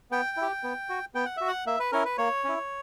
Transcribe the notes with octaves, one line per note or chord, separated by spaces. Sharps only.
B3 G5
E4 G4
B3
F#4
B3 G5
F#5
F#4 E5
F#5
A#3 E5
B4
C#4 E4 A#4
B4
A#3 C#5
C#4 E4